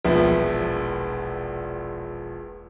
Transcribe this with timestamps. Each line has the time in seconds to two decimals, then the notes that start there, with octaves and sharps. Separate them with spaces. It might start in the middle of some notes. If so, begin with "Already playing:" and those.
0.05 E1 A#1 F3 B3 E5